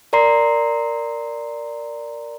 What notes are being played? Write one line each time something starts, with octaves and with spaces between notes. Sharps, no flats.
A#4 D5 A#5 C6 C7